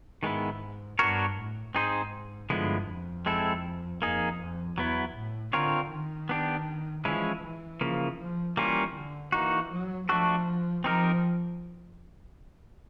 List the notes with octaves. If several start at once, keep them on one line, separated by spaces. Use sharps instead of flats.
G#2 D#3 G#3 B3 E4
G2 B3 D4 F#4 A#4 C#5
A2
G#2 C4 D#4 G#4 C5
G2 D3 F3 G#3 B3 E4
F2
G#3 C4 E4 A4
F2 A#3 D#4 G#4
F2
E2 F#3 B3 E4
A2
D3 C4 F4 A#4 C#5
D#3
B3 D4 G4
E3 F3 G#3 C#4 E4
E3
C#3 F3 A#3
F3
E3 G3 A#3 C#4 F4
D3
E3 A#3 D#4 F#4
F#3
F3 A3 D4 F#4 A4
F3 C4 D#4 G4 A#4